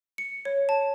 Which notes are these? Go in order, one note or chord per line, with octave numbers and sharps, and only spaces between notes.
C#7
C#5
A5